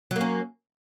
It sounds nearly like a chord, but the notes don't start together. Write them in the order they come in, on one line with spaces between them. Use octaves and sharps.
F#3 A#3 C#4